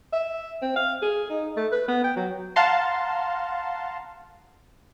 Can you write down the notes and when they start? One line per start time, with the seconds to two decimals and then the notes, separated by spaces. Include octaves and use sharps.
0.13 E5
0.62 C4
0.76 F5
1.02 G#4
1.30 D#4
1.57 A3
1.72 B4
1.88 B3
2.04 G5
2.16 F#3
2.56 F5 F#5 A5 A#5 C6